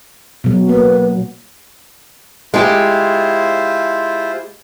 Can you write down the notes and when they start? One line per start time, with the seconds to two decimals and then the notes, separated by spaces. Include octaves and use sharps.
0.44 B2 F#3
0.69 A#3 B4
2.54 G#3 E4 F4 G4 C5